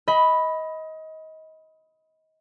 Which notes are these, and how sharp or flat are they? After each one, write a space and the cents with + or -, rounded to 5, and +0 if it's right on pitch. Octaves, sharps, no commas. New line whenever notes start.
D#5 +25 B5 +0